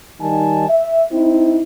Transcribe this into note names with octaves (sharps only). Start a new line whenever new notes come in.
D#3 G3 D#4 G#5 A5
E5
C4 D#4 E4